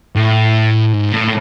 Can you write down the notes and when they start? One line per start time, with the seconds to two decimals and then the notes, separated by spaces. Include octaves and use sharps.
0.16 A2
0.93 G#2
1.12 A2